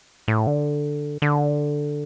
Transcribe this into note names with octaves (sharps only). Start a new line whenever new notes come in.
A2
D3
D3